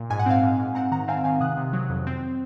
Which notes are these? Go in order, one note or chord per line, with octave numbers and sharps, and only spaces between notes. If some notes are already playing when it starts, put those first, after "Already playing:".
Already playing: A#2
G#2 G#5
F#5
C4 F5 G#5
G#2
G#2
C4 F#5 A#5
D#3 F#5 A#5
C4 F5 G#5
D#3 F5 G#5
C3 D#6 F#6
C3
F#3
F2
C4